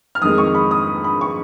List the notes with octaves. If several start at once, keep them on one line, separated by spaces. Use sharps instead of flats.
F6
F2 D#3 G#3 D#6
C#6
B5
D#6
B5
C#6